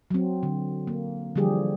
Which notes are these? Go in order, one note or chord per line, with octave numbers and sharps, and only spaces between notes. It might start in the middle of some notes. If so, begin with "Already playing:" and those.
F#3 C4
D3
A#3
D3 E3 F3 G3 G4 G#4